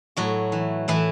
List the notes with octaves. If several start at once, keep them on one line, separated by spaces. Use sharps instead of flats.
A2 F#3 F#4
E3
A2 E3 E4